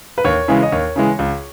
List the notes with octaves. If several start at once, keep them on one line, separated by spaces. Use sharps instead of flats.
B4
D#2 C#5
C#3 E3 G#3
D#5
D#2 C#5
C#3 E3 G#3
C#2